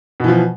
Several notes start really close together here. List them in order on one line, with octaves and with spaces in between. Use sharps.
B2 E3 F3